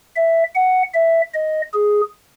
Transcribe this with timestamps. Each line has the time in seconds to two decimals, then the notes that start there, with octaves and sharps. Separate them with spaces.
0.16 E5
0.55 F#5
0.94 E5
1.34 D#5
1.73 G#4